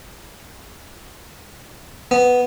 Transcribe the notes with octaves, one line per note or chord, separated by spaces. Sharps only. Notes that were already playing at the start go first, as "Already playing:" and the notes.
B3